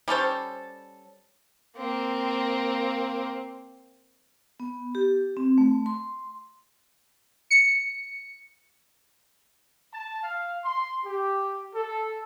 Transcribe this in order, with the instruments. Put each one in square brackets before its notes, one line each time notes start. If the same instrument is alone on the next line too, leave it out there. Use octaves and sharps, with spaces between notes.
[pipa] G3 C#4 A4 C5
[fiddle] A#3 C4
[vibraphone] B3
G4
C4
A3
C6
[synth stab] C#7
[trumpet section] A5
F5
C6
G4
A4